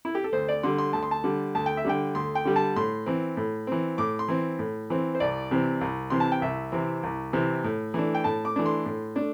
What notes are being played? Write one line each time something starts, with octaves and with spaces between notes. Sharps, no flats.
E4
G4
A4
D2 C5
D5
D3 G3 C6
C6
D2 A5
C6
A5
D3 G3
D2 A5
G5
E5
D3 G3 G5
D2 C6
G5
D3 G3
A5
A2 C6
E3 C4
A2
E3 C4
A2 D6
C6
E3 C4
A2
E3 C4
C5
C2 D5
C3 E3 C4
C2
C3 E3 C4 C6
A5
G5
C2 E5
C3 E3 C4
C2
C3 E3 C4
A2
E3 A3 D4
G5
A2 A5
D6
E3 A3 D4
C6
A2
A3 D4